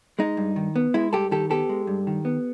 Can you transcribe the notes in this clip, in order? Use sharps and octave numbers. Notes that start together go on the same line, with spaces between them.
G#3 D#4
G2
D#3
B3
G#3 E4
G2 G4 A4
D#3 G4 A4
B3 G4 A4
G#3
G2
D#3
B3